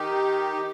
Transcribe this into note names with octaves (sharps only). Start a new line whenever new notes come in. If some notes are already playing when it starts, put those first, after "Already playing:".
Already playing: D#3 D#4 G4